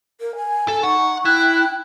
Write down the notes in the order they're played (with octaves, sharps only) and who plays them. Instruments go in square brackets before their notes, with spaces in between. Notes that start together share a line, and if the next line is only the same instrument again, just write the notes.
[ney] A#4
G#5
[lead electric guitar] A4
[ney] D#4 [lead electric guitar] F#5 [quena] C#6
[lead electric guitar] E4 [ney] G5 [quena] F#6